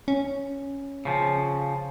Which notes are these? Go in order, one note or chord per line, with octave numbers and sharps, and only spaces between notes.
C#4
C#3 F3